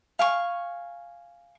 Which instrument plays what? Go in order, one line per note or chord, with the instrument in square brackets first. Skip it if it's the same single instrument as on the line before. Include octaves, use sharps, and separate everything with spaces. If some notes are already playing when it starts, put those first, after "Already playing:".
[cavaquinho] F5 G#5 C#6